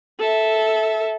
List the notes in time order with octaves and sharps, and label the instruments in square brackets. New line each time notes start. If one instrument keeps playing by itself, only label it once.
[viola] A4 E5